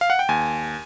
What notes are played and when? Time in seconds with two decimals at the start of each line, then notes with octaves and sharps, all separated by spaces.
0.01 F5
0.10 F#5
0.19 G5
0.29 D#2 G#5